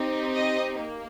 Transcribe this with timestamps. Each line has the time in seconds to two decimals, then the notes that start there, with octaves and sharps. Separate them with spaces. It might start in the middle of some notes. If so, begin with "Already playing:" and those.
Already playing: C4 D#4 G4
0.34 D#5
0.79 A#3